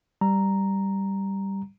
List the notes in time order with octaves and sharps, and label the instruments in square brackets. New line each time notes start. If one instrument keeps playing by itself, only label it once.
[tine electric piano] G3 A#5